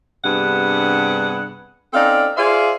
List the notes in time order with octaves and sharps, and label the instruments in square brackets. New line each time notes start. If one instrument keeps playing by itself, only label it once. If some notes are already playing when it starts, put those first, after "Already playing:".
[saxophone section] G2 C3 B3 D4 G#4 F#5
C4 C#4 D#4 A4 D5 F5
F4 G#4 C5 D5 E5 F5